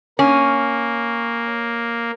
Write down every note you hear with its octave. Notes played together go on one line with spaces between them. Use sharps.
A#3 C#4